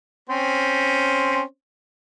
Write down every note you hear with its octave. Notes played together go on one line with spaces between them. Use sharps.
C4 C#4 C5